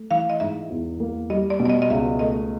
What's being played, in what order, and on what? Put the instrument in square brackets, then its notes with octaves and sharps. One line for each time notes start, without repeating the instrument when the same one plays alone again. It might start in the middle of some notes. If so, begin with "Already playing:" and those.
Already playing: [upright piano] A3
[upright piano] E3 [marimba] F5
[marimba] D#5
[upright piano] G#2 [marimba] E5
[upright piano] E2
A#3
[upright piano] G3 [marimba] D#5
[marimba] D5
[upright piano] B2
[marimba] D5
D#5
D#5
[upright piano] C#2 [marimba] E5
[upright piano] A3 [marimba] D#5